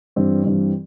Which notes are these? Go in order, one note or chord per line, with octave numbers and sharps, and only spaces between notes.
G2 E3 G3 C4
G2 E3 G3 C4